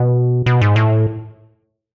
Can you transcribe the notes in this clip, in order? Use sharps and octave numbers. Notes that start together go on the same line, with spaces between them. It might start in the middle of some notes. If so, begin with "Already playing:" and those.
Already playing: B2
B2
G#2
A2